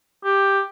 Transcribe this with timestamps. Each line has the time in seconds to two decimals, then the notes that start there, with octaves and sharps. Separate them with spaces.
0.24 G4